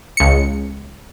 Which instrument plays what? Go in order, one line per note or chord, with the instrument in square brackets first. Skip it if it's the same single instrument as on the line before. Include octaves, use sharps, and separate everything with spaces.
[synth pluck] C#2 C#7